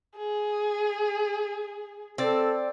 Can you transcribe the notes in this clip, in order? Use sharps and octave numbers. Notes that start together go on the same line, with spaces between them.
G#4
C4 A4 D5